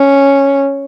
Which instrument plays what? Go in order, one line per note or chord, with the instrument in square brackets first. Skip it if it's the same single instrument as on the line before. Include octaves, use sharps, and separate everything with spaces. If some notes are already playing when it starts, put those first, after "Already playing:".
Already playing: [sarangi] C#4